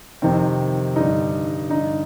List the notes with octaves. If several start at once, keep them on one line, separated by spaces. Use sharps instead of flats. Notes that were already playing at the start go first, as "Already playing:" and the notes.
F2 C3 D#3 C4
G2 D3 D#4
G2 D3 D#4